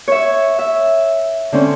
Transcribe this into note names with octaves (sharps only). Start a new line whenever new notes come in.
C#5 E5
E5
D3 C4 C#4